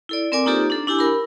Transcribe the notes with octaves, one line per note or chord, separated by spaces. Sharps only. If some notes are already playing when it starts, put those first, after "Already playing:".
E4 A4 D5
C4 A#4 D5 G#5 D6
A#3 D#4 F4 G4 A4 C5
D4 A4
D4 E4 G4 G#5 E6
A#4 B5